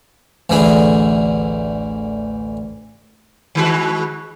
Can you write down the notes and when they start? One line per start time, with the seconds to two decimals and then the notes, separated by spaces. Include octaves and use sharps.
0.50 A1 D2 D3 E3 G#4
3.55 D#3 G#3 F#4